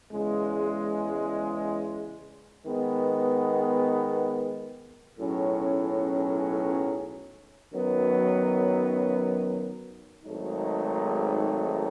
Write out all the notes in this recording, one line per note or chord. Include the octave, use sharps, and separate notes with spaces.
E2 C#3 G#3
D#3 G#3 B3
B1 A2 F#3 C#4 G#4
F#2 D#3 F#3 B3
G#1 G#2 F#3 A3 D#4